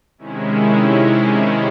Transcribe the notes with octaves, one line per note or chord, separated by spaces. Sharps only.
C3 D#3 G#3 C#4 E4